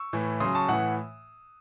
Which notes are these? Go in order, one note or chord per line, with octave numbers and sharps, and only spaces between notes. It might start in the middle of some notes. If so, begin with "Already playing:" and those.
Already playing: C#6 E6
A2 E3
C#3 F#3 C6 D#6
A5 C#6
A2 E3 F#5